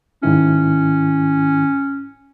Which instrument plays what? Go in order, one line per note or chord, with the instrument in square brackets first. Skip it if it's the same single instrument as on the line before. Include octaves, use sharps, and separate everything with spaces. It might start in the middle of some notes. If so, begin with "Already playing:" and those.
[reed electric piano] G#2 D#3 E4 [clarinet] C#4